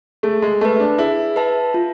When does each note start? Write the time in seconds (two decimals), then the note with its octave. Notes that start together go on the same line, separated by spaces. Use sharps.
0.23 A3 G#4
0.42 G#3
0.61 A3 B4 E5 A5
0.80 D4
0.98 E4 G#4
1.36 B4 E5 A5
1.74 F4